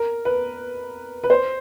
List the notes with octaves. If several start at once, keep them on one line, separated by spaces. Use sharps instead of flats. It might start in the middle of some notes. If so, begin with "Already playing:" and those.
Already playing: A#4
B4
B4
C5